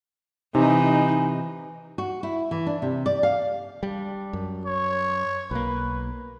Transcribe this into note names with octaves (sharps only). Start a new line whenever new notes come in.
C3 E3 D#4 G#5
F#4
E4
E3
D4
C3
D5
F5
G3 D4
F#2
C#5
B1 A#3 B4